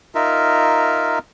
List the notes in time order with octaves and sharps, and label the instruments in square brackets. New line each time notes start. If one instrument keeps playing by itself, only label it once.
[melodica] D#4 F4 A#4 E5